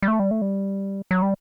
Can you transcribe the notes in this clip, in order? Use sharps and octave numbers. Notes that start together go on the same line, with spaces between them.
G3
A3
G3
A3
G3
F#3
G3